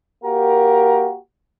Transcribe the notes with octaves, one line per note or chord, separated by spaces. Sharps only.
A#3 F#4 G4 A#4